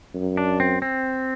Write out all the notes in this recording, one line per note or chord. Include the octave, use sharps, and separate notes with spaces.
F#2
D4
C4
C4